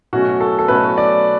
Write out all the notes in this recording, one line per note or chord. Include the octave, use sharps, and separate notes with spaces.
B2 F#3 A3 C#4 F#4
A4
A4
B2 F#3 A3 C#4 B4
D5